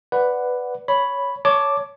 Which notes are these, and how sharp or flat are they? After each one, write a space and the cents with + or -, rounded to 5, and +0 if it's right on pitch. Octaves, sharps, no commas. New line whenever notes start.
B4 +5 D5 +0 F#5 +0
C#5 +10 B5 +0
C#5 +15 A5 +0 D6 +0